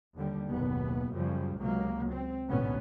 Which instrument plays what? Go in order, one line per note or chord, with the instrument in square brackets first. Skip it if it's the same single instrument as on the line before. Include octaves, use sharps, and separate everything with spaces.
[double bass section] D#2 D3 G3
F#1 D#2 B2 B3
F#2 C#3 F3 G3
C#2 C3 F#3 A#3
C4
A1 D2 G#2 B2 B3 C#4